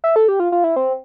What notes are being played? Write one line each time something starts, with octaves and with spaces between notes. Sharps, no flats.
E5
A4
G4
F4
F4
E4
C4